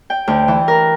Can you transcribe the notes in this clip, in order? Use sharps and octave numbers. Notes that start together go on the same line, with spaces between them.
G5
D2
E3
A#4